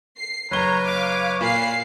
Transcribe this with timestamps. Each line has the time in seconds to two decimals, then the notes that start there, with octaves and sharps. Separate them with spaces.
0.15 C7
0.51 F#1 B4 C#5 A#5 G7
0.84 F5 D6
1.41 A#2 F5 B5 C7